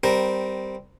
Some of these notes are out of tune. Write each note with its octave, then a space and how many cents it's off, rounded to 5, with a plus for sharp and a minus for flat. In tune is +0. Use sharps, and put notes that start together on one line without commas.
G3 +0 C4 -15 A#4 +0